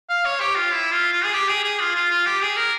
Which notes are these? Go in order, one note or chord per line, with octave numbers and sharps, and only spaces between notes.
F5
C#5
G4
F4
E4
F4
F4
G#4
G4
G#4
G#4
F4
F4
F4
G4
G#4
A#4